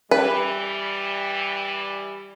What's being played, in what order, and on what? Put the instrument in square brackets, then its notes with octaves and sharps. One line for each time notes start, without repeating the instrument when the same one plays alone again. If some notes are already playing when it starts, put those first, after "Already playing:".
[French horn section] E3 G3 [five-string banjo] B4